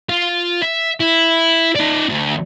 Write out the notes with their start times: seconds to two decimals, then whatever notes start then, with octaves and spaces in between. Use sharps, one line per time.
0.09 F4
0.62 E5
1.00 E4
1.76 D#4 D5
2.09 D2